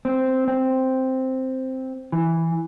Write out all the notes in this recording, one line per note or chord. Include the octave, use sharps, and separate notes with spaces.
C4
C4
E3